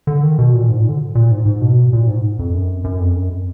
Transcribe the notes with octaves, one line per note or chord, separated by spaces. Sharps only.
D3
D#3
B2
A#2
G#2
A#2
D3
A#2
G#2
G#2
B2
A#2
G#2
F2
F#2
F#2
F2
F#2